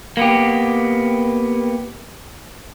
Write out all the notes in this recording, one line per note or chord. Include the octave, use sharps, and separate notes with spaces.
A#3 B3 G4